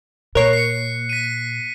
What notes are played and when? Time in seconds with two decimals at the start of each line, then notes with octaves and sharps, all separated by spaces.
0.35 A#2 A#4 C#5 F#6 C7
0.53 C7 C#7
1.09 B6 D#7